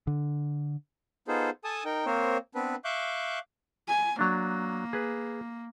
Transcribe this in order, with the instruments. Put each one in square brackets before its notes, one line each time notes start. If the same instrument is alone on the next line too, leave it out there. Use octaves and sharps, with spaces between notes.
[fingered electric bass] D3
[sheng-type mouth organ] B3 D#4 F4 G#4 A4 C5
A4 G#5 A5 D#6
D#4 A#4 G5
A#3 C4 A#4 C5 C#5
B3 C4 D4 B4
E5 F5 C#6 D6 F#6 G6
[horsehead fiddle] G#5
[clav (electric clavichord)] F#3 D4 [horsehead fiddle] A#3
[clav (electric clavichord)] G#4 B4